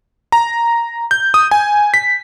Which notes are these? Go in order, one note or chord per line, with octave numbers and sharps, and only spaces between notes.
A#5
G6
D#6
G#5
B6